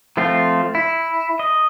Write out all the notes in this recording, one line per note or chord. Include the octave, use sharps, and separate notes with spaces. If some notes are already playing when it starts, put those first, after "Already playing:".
F3 A3 C4 F4
E4
D#5